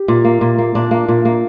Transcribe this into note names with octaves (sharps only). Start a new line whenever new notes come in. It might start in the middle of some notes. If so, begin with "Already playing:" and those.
Already playing: G4
A#2
A#3
A#2
A#3
A#2 D4
A#3
A#2
A#3